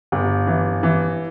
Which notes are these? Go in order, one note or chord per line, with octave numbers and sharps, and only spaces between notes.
G1
E3
E3